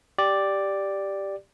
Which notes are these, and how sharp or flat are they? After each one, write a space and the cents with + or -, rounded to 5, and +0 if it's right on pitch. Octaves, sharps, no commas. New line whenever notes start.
G4 +0 D5 +0